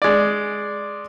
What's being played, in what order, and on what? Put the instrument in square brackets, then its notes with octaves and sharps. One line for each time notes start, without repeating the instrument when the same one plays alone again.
[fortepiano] G#3 D5